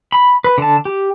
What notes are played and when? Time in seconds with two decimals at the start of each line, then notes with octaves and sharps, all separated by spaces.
0.12 B5
0.44 B4
0.58 D3 A5
0.85 G4